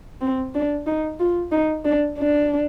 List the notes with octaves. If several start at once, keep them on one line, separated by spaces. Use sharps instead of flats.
C4
D4
D#4
F4
D#4
D4
D4